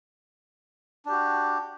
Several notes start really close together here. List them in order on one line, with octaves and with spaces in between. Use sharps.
D4 G4 F#4